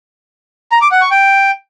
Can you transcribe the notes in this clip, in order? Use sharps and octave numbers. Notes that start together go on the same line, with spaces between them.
A#5
D6
F#5
C#6
G5